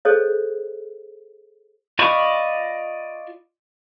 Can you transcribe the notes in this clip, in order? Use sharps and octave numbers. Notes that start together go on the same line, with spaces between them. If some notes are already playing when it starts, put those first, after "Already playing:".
G#4 A4 C5 C#5 D#5
F4 D5 D#5 B5 C#6